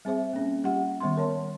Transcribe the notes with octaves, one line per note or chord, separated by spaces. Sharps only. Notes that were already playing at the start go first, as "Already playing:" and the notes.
G3 C4 G#4 C5 E5
A#3 C#4
G3 F4 G4 F#5
D#3 G3 B3 C6
A#4 C#5 A5 C6